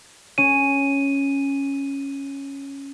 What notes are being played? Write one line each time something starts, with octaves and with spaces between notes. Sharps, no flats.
C#4 D#7